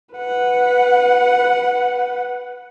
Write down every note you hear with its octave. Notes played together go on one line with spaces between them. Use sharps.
B4 F#5